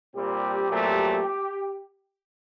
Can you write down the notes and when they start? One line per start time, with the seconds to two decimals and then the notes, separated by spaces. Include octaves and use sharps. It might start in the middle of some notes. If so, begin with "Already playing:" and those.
0.16 A#2 G3 C4 G4
0.69 A#2 F#3 A3 C4